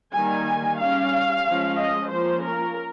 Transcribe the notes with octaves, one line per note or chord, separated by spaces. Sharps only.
D#3 G3 A#3 G#5
G3 C#4 F5
F3 G#3 C#4
D#5
F3 A#3 C#4 C5
A#4